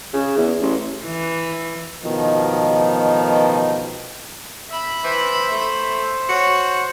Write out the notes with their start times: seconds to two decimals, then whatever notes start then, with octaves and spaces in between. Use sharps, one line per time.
0.13 C#3
0.37 E2
0.61 A1
1.04 E3
2.04 A1 B2 D#3 F3
4.70 E5 B5
5.04 E3 C5
5.51 A3
6.29 F#4 C#5